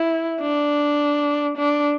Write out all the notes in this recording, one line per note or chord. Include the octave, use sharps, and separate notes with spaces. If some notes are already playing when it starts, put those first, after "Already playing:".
Already playing: E4
D4
D4